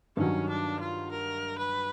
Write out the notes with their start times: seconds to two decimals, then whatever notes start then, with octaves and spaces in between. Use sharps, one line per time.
0.17 G2 D#3 F#3 C#4
0.49 D4
0.80 F4
1.11 A#4
1.58 B4